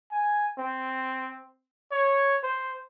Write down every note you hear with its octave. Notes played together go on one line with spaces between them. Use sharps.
G#5
C4
C#5
C5